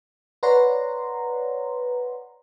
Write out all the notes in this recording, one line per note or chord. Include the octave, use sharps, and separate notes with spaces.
B4 C#5 D5 F#5 A#5 C6